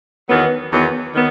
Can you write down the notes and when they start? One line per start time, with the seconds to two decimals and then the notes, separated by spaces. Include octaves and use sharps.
0.28 E2 D#3 F#3 B3
0.70 E2 D#3 F#3 B3
1.13 D#3 F#3 B3